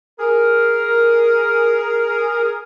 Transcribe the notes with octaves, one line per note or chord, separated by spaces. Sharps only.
G#4 A#4